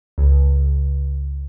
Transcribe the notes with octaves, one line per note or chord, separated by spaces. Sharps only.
C#2